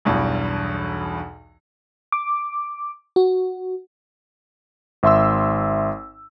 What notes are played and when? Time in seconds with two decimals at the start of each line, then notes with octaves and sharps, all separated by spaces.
0.05 B1 E2 G2 B2 E3
2.12 D6
3.16 F#4
5.03 G#1 E5 C6 E6